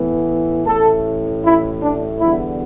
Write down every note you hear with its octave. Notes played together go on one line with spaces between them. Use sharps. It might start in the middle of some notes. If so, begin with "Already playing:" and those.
Already playing: A2 E3 B3
A1 A2 A3 A4
E4
D4
E2 D3 G3 B3 E4